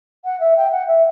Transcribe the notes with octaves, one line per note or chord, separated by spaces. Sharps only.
F#5
E5
G5
F#5
E5